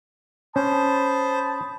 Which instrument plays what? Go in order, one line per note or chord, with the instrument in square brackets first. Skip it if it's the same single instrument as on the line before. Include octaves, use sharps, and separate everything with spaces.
[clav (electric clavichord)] C#4 [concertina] C5 [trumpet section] A5 B5 D#6